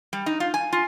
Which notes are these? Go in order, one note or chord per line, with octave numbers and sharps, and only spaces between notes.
G3
D#4
F4
G#5
F4